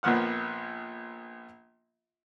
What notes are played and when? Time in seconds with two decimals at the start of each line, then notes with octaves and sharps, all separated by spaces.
0.03 A#1 A#2 F3 B3 F#5 F6